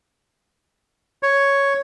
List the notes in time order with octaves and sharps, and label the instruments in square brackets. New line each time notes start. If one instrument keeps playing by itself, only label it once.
[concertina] C#5